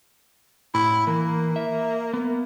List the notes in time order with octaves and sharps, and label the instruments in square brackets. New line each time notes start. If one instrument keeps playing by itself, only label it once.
[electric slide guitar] A2 [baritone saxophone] E4
[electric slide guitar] E3 [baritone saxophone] A#3
[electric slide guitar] E5
[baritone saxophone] A#3 [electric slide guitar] B3